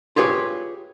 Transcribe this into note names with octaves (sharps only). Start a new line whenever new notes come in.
F4 G4 G#4 B4 C#5